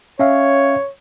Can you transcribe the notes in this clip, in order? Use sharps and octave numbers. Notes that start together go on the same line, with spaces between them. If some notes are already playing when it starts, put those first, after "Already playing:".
C#4 C#5 E5 F5